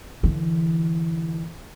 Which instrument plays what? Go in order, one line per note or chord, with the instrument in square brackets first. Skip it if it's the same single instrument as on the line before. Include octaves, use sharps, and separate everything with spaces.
[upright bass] D3 E3